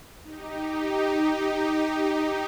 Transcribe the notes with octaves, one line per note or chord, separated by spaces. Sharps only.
D#4 G4